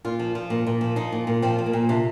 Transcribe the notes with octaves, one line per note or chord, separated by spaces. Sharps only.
A#2 F4
F3
F3
A#2
A#2
F3
F3 D#4
A#2
A#2
F3 C4
F3
A#3
A#2
C3 D4